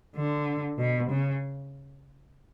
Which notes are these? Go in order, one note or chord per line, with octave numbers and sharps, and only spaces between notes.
D3
B2
C#3